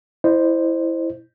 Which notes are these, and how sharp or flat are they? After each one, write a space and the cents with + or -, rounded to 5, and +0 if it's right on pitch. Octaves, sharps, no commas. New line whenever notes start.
E4 +0 C5 +0 D#5 -45